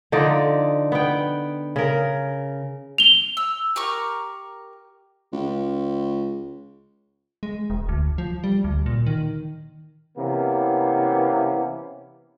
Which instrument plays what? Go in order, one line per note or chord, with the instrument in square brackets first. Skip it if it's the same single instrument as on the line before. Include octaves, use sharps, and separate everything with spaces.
[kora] D3 F3 D#4 D5
B3 G5
C#3 A#4
[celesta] F7 G7
[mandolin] E6
G4 A#4 C#6
[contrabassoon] C#2
[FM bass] G#3
E1
D2
F3
G3
D2
A#2
D#3
[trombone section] C3 E3 A#3 B3 C#4